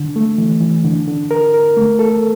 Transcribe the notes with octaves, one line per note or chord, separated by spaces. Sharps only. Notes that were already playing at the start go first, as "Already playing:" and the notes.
Already playing: D3
A3
E3
E3
D3
D3
A#4
A#4
A3
A4